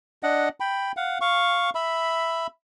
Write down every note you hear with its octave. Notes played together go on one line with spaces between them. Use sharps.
D4 D#5 F#5
G5 B5
F5 F#5
F5 C#6
E5 B5